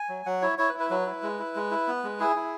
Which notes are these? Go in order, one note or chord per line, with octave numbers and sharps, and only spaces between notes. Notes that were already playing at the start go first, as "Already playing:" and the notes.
Already playing: G#5
F#3
F#3 F#5
E4 C#5
E4 C#5
B4
E4
B4
F#3 B4
E4
G#3
E4
G#3
E4
B3
G#3
E4 G#4
E4